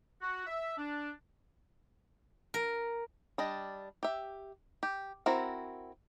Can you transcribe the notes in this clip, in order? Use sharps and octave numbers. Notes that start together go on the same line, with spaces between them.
F#4
E5
D4
A#4
G3 D4 D#5
G4 E5
G4
C4 E4 F#4 A#4